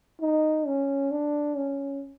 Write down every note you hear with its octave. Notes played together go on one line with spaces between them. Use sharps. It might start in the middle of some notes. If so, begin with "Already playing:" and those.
D#4
C#4
D4
C#4